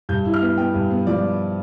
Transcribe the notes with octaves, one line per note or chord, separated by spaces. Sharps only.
G2 G6
E4
F6
B3
B3 G5
G2
B3
F3 D5